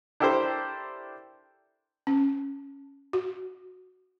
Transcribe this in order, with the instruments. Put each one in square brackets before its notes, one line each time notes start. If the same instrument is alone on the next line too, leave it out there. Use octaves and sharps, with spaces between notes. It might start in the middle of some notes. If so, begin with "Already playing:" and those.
[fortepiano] D4 E4 G4 A4 A#4 C5
[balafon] C#4
F#4